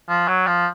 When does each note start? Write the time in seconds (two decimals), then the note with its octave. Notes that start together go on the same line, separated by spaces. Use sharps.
0.09 F3
0.28 F#3
0.47 F3